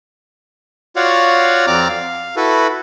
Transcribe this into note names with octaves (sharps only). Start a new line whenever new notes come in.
F4 F#4 C#5 D5 F5 F#5
F2 C4 D5 A#5 D6 F6
F5
E4 F#4 A4 B4